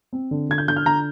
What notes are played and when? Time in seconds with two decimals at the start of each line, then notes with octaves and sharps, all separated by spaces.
0.13 C4
0.31 D3
0.49 D3 G#6
0.58 G6
0.68 D3 G6
0.76 F6
0.86 D3 A#5